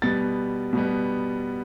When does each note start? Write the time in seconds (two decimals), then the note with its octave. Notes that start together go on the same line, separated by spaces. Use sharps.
0.02 B2 G3 B3 A6
0.73 B2 G3 B3